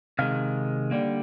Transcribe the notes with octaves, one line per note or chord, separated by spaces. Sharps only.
C3 D#3 G#3 F5
D3 G3 A#3